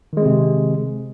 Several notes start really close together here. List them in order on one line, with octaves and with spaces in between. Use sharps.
D#3 G#3 C4 C3